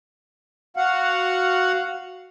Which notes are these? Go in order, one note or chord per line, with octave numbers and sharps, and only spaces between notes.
F#4 F5 F#5